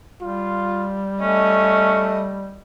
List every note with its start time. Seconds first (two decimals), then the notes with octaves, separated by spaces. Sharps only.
0.22 G3 F4
1.21 A3 C#4 D#5